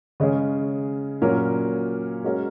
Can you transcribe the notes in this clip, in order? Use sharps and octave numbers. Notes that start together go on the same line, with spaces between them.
C#3 G#3 C#4 G#4
A#2 F#3 C#4 A#4
G#3 C#4 F#4 A#4